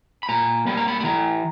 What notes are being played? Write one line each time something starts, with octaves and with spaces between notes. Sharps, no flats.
B5
A#2 A#5
G3 A#3 B5
A#5
B5
B5
E3 A#5